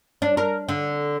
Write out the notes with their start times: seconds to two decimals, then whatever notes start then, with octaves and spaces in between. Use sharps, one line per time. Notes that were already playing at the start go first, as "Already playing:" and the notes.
0.22 D4
0.37 A#4
0.69 D3